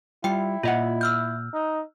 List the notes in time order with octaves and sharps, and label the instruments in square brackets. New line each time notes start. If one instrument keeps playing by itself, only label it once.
[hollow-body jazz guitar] G3 F4 [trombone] E4 [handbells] G5 C#7
[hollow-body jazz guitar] A#2 E5 F#5 [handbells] F4 D#5
[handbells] E6 F6 G6
[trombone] D#4